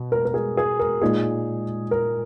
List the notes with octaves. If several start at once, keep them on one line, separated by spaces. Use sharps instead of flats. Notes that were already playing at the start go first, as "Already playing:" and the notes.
Already playing: B2
A#4
A#4
G#4
G#4
A#4
A#2 G#3 D#4 G#4
A#4